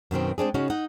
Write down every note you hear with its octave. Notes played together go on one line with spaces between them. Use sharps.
F#2 B2 D#3 C4
G#3 C4 D4 G#4
C#3 C#4 D#4 F#4
D#4 F#5